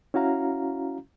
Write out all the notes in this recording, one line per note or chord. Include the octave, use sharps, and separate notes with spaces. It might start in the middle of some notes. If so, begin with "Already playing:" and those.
C#4 E4 F#4 F5 A#5